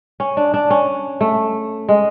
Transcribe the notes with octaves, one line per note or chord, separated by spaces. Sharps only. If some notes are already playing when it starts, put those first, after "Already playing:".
C#4
D4
D4
C#4
A3
G#3